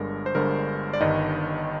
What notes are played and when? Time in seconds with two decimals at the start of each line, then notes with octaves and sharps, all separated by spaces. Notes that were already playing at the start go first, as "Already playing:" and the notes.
Already playing: G1 G2 D3 G#3 A#4
0.26 C5
0.34 G1 G2 D3 G#3 A#4
0.93 D5
1.01 G1 G2 D#3 D#5